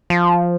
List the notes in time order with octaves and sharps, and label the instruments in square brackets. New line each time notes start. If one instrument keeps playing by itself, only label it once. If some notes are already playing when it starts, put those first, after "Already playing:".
[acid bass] F3